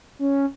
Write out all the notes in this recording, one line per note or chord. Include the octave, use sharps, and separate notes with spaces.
C#4